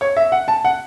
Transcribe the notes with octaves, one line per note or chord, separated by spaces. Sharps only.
C#5
E5
F#5
A5
F#5